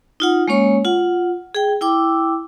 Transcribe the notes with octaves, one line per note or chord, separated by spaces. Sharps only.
D#4 F4 F#5
G#3 A#3 C#4 C#5 C#6
F4 F#5
G#4 G5
E4 G5 D6 E6